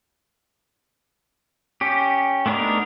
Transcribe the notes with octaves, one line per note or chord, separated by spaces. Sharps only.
C#4 G4
A3 B3 D4 D#4 A#4